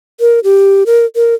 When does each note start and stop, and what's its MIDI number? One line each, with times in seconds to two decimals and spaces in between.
0.20 0.40 70
0.44 0.84 67
0.86 1.05 70
1.16 1.34 70